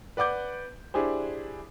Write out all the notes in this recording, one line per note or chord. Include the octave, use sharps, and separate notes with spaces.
B4 D5 F#5 D6 G6
D4 E4 G4 G#4 C5